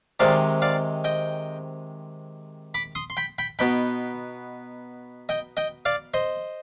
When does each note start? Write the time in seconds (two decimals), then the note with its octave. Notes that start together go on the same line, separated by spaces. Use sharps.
0.20 C3 D#3 G#3 C4 D#4 D5 F5
0.62 D5 F5
1.04 D#5 G5
2.74 B5 D6
2.95 C6 D#6
3.10 C6
3.17 G5 B5
3.38 G5 B5
3.59 B2 B3 D#4 G5 B5
5.29 D#5 G5
5.57 D#5 G5
5.85 D5 F5
6.14 C5 D#5